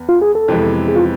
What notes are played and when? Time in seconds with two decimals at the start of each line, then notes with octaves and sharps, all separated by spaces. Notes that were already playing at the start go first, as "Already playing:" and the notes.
Already playing: E2 B3
0.09 F4
0.22 G#4
0.35 A4
0.48 F2 C3 E3 G#3 B3
0.88 G#4
0.96 F4